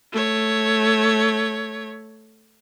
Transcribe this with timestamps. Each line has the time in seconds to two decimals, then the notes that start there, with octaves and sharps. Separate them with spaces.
0.12 A3 C#5